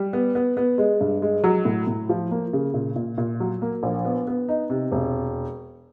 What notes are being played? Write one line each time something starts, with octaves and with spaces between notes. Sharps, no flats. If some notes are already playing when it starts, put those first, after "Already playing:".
Already playing: G3
B3
B3
B3
G#3
G2
G#3
F#3
A2
A2
F3
A#3
C#3
A#2
A#2
A#2
F#3
A#3
A#1
B3
B3
D#4
C3
E1